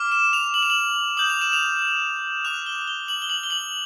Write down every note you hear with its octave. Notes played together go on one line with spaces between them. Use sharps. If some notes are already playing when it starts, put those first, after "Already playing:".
Already playing: D6 F6
E7
F7
F#7
F7
F#7
D#6 G6 F#7
F7
E7
F7
D6 F#6 F7
G7
G7
F#7
G7
F#7
G7
F#7